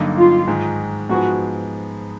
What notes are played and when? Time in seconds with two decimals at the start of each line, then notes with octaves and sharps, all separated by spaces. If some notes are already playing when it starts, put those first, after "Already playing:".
Already playing: G2 D3 F#3 A#3 D#4
0.18 F4
0.47 G#2 D#3 G#3
1.09 G#2 F3 G#3 B3 F#4